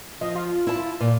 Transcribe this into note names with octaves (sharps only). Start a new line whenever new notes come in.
F3 D#5
F4
E4 A5
A#2